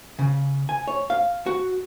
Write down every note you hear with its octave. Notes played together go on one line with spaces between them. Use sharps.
C#3
G#5
C#5
F5
F#4